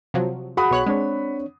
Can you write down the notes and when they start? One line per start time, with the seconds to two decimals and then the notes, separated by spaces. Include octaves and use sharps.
0.14 C3 F3 F#3
0.57 F#4 G#4 F#5 B5 D#6
0.71 B1 C#5 F#6
0.86 G#3 C4 D4 C#5